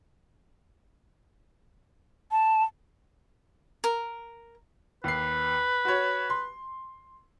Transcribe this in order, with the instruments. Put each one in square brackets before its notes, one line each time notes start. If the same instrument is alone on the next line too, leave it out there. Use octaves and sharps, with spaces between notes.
[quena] A5
[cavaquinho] A#4
[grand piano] D#2 C7 [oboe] B4
[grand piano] F#4 C#5
C6